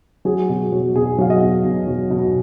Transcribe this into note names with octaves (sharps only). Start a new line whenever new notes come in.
F#3 G#4
B2
F#3
B2 G#4
F#3 F5
D#5
B2
B2
F#3
B2